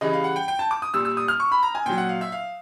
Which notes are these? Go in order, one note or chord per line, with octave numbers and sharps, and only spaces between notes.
C#3 E3 G3 D#5
F5
F#5
G5
G5
A5
D6
D#6
A#2 G3 E6
E6
D#6
F6
C#6
B5
A#5
G#5
A#2 F#3 G5
F#5
F5
E5
F5